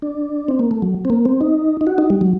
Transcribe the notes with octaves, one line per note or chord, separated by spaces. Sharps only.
D4
C4
A#3
A3
F#3
C4
A#3
C4
D#4
D#4
F#4
D#4
G3
F#3